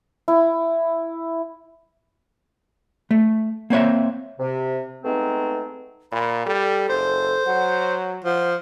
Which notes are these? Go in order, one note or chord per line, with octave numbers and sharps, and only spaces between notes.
E4
A3
A#3 C4 C#5 E5
C3
G#3 A3 B3 C4 D#4
A#2 B5
G3 A4
F#1 C5
F#3 F#5
F3 F#5